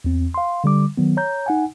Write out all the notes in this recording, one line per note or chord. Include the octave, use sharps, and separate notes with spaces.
E2 C4
F5 C6
D3 G3 D6
D#3 F#3 B3
C#5 A#5 G6
D#4 F#5 G#5